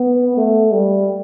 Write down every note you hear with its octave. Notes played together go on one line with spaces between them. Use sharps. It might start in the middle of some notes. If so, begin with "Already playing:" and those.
Already playing: B3
A3
G3